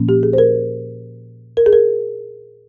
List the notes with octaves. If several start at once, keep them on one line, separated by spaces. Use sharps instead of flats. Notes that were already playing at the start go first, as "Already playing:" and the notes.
Already playing: A#2 F3 A#3 C#4
G4
G#4
C5
A#4
A#4
G#4
A#4